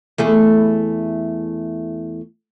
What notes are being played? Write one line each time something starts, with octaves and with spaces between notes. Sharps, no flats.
E2 A3 G#4